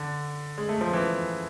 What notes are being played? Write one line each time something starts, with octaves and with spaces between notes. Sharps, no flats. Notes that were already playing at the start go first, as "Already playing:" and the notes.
Already playing: D3
G#3
A3
F3
E3